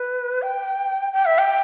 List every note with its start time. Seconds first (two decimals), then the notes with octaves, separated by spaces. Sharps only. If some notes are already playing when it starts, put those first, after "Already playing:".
Already playing: B4
0.42 G5
1.12 G5
1.25 E5
1.38 G5